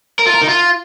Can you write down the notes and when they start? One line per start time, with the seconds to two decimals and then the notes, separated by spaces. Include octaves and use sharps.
0.19 A#4
0.26 F4
0.34 A#4
0.41 D#4
0.49 F4